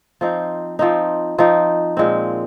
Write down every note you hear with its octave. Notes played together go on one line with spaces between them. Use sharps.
F3 C4 D#4
F3 C4 D#4
F3 C4 D#4
A#2 G#3 C4